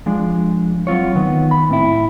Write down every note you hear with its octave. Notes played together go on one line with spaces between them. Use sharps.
F3 G#3 D4
F#3 C4 F4 C#5
D#3 B3
B5
A2 C4 E4